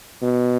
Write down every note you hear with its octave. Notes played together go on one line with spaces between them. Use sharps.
B2